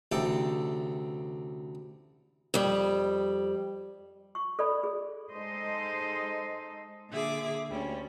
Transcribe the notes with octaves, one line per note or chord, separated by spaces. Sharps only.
A1 D2 C3 A4 G5
F2 G3
C#6
A4 D5 B5
G#4
G#3 D#4 A4 C5 D#5
A#2 D3 G#4 E5 D6
D2 G3 C#4